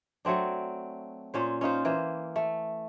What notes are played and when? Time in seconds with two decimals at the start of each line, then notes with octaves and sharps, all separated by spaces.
0.25 F#3 A3 C4 D4
1.34 A#2 C#4 C5
1.61 C#4 D#4 F4 C5
1.85 E3 A#3 C5
2.36 A3